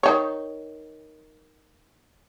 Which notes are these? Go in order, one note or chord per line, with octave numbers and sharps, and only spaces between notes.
D#3 C#5